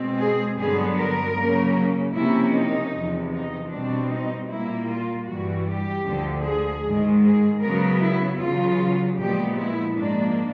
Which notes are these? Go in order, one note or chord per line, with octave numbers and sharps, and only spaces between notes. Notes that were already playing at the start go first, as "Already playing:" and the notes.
Already playing: B2 G#3 C4
G#4
G2 D3 F#3 B3 G#4
A#4
C#3 F#3 A#3 C#4
C3 F3 A#3 C#4 E4
D#4
E2 C3 F3
D#4
B2 G3 C4 D4
D#4
A#2 G3 A#3 E4
F4
G2 E3 G3 F#4
G4
D2 D3 F3
G#4
G#2 D#3 G#3
G#4
C#3 F#3 B3 A#4
E4
E2 C#3 F#3 F4
A#2 F3 G#3 B3 G4
E4
G#2 F3 A#3 D4